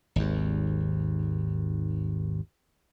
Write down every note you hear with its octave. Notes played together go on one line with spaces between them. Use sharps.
G#1 D#2